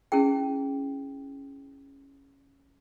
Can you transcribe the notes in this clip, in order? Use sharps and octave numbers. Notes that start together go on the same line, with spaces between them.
C#4 E4 G#4 G5